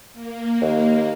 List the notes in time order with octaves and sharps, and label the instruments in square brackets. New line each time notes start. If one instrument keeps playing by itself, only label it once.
[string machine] A#3
[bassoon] D#2